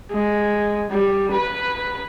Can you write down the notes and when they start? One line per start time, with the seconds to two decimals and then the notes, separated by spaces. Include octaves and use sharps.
0.12 G#3
0.91 G3
1.32 B4